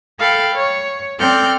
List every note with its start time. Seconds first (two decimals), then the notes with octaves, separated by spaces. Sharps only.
0.19 A4 F5 G5 B5
0.54 C#5
1.20 C4 A4 D5 F6 G6